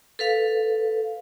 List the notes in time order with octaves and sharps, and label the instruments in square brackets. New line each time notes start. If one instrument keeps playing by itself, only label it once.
[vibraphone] A4 B4 F5